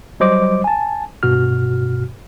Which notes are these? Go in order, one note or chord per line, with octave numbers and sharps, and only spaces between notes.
F#3 G3 C5 D#5 D6
G#5 A5
G2 B2 F#4 F6